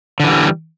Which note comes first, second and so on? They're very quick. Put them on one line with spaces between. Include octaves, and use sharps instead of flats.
D3 E3 G3